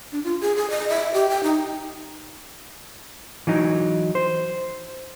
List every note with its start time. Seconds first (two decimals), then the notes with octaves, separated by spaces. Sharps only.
0.12 D4
0.24 F4
0.41 G#4
0.56 G#4
0.70 D#5
0.90 E5
1.14 G4
1.30 G5
1.43 D#4
3.47 E3 F#3 D#4
4.15 C5